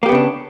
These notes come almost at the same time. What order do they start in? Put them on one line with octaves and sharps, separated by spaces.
A#3 G4 B3 C#3 D4